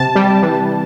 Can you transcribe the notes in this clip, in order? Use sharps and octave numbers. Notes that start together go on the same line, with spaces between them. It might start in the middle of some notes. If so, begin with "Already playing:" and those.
Already playing: C3 A5
G3
E3